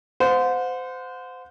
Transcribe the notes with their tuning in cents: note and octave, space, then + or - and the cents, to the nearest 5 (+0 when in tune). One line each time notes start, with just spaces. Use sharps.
C5 -25 F#5 -40